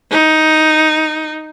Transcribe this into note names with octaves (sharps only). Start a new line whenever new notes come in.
D#4